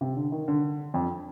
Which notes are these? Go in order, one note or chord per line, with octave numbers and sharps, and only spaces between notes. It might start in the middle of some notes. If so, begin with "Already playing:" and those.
C3
D3
D#3
D3
F2